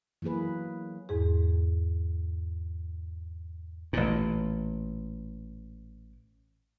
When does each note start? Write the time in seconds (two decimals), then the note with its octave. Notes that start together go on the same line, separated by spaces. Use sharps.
0.22 E3 F#3 A#3 G#4 B4
1.09 E2 G#2 G#4
3.93 A1 A#2